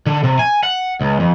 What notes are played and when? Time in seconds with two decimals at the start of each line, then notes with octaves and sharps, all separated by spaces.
0.06 D3
0.24 C3
0.39 G#5
0.63 F#5
1.01 C#2
1.20 F2